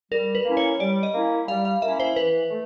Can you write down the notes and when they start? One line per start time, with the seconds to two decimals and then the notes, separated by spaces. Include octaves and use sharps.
0.12 G3 A#4
0.35 B4
0.45 A#3 C#4 E4
0.57 C#5
0.79 G3 D5
1.03 D#5
1.14 A#3 C#4 E4
1.48 G3 F5
1.65 F5
1.82 A#3 C#4 E4 E5
2.00 C5
2.16 E3 B4
2.50 A3